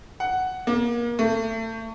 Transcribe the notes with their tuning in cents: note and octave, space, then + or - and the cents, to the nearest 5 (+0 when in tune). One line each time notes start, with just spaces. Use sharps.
F#5 +5
A#3 +30
A3 +30